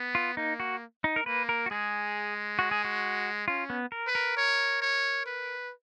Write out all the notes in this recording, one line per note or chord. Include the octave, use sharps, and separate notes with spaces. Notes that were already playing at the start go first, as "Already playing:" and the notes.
Already playing: B3
F4
A#3 D#4
F#4
D#4
A#4
A#3 B4
A#4
F#4
G#3 G#4
F#4
G#4
F#4
C#4 F4
B3
A#4
B4
A#4
C#5
C#5
B4